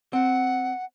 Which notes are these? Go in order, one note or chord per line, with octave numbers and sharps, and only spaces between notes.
C4 F#5